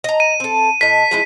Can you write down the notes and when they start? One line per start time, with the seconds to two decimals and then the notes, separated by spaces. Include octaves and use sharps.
0.04 D#5 A#5
0.20 D#7
0.40 C4 A4
0.81 A2 D#5 B6
1.11 F3 G#3 E4